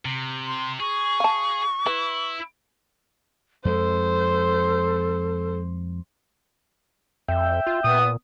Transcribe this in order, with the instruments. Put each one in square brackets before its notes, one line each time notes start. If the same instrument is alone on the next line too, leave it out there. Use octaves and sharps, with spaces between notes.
[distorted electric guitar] C3
[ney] C6
[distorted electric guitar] G#4 [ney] C#6
[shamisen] F5 A5
[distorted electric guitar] E4 [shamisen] B4
[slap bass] F2 G#3 [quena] A4 [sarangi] C5
[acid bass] F2 [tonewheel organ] E5 G5
[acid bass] F4
[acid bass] A#2 [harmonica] B3 D#6